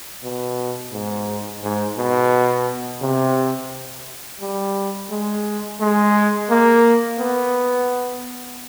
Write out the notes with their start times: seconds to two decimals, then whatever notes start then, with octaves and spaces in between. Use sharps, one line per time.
0.24 B2
0.92 G#2
1.63 G#2
1.97 B2
3.02 C3
4.41 G3
5.10 G#3
5.81 G#3
6.50 A#3
7.19 B3